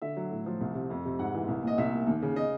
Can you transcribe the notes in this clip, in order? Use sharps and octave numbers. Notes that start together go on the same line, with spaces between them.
D3 E5
F#3
A2
F3
C2
C3
F2
C3
G#2 F#5
E3
C2
A#2 D#5
C2 E5
A#2
D#2
C#3
D#5